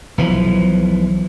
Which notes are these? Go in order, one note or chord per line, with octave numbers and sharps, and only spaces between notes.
B1 E3 F3